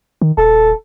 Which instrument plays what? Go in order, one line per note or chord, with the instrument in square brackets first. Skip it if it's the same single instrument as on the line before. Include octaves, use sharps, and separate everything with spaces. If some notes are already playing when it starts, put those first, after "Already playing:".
[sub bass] D#3
[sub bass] D#1 [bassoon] A4